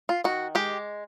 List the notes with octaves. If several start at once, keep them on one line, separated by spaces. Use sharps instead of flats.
F4
D#3 F#4
G#3 G4